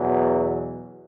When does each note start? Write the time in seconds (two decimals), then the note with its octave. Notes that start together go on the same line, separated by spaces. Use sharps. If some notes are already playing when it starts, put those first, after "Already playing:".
Already playing: E2 B2 F#3